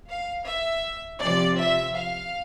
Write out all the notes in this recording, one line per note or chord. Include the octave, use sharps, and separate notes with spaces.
F5
E5
C3 F3 D5
E5
F5